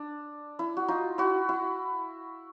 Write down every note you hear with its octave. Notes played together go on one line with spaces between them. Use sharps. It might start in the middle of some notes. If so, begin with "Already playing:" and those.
Already playing: D4
E4
F#4
D#4 F4
E4 F#4
E4